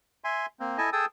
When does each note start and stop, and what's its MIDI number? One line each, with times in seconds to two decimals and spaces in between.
0.24 0.46 76
0.24 0.46 80
0.24 0.46 84
0.60 0.78 58
0.60 0.78 60
0.78 0.90 64
0.78 0.90 69
0.78 0.90 75
0.78 0.90 80
0.78 0.90 81
0.93 1.06 68
0.93 1.06 69
0.93 1.06 79
0.93 1.06 81
0.93 1.06 87
0.93 1.06 88